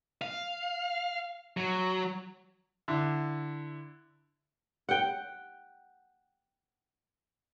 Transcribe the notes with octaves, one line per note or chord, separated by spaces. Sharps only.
F5
F#3
D3 E4
F#5 G5